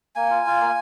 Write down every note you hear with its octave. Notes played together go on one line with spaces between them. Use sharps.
A#3 G#5
F4
F4
A#3